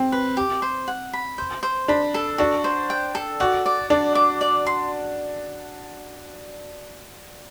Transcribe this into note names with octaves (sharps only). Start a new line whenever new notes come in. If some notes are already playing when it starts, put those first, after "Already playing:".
Already playing: C4
B4
G4
C5
F#5
B5
C5
C5
D4 B5
A4
D4 F#4
C5
G5
A4
F#4 D5
D5
D4 D5
D6
D5
C6